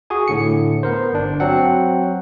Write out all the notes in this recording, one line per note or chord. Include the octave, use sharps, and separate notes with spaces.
F#4 G#4 G#5
A2 D3 C#7
B3 A#4 C5
G1 D4
F#3 C4 F#5